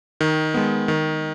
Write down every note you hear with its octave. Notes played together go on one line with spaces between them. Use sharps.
D#3
G#3 B3
D#3